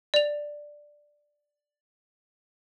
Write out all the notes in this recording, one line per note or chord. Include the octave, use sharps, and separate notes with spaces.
D5 F7